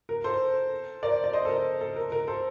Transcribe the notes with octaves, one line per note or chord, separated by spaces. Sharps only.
A#4
A4 C5
A#4 D5
D5
C5 D#5
A4
A#4
A4
A#4
A#4
A4 C5